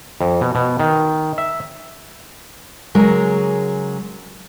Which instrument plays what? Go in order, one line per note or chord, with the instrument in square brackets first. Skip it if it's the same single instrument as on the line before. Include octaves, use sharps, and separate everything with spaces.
[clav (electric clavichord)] F2
B2
B2
D#3
E5
[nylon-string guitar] C#3 F#3 G#3 A#4